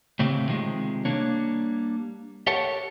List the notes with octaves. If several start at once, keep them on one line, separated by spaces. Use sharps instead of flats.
A2 C#3 A3 C4 G4
C3 D#3 F3 G#3
G3 A#3 D4 C#5
G4 A4 A#4 C#5 F#5 A5